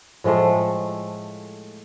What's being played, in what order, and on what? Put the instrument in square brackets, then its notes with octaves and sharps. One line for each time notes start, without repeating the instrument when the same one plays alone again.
[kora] A2 F3 G#3 A3